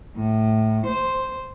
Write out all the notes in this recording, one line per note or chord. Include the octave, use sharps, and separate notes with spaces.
A2
C5